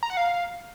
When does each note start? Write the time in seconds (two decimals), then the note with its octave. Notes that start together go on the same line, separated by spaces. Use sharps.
0.03 A#5
0.10 F#5
0.17 F5